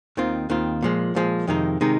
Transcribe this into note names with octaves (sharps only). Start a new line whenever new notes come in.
D#2 D#3 C4 F4
D#2 D#3 C4 F4
A#2 F3 G#3
A#2 F3 G#3
F2 C3 D#3 G#3 D#4
C3 D#3 G#3 D#4